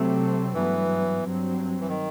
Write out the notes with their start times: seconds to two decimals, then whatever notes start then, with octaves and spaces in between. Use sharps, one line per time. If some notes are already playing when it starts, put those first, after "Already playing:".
Already playing: C3 F#3 A3 C4
0.55 G2 E3 F#3 B3
1.21 G2 F#3 C4
1.81 E3
1.88 D#3